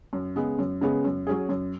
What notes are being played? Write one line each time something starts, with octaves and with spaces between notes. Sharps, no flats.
F#2
C#3 G#3 B3
F#2
C#3 G#3 B3
F#2
F#3 C#4 G#4
F#2